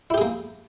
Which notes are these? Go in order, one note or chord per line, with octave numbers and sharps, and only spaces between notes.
A#3 E4 G4 G#4